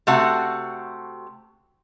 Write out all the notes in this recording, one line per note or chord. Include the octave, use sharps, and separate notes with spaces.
C3 A3 F#4 F#5